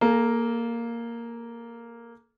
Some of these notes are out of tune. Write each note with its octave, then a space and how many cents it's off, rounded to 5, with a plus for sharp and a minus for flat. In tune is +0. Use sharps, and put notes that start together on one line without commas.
A#3 +0 A4 -35 A#5 +0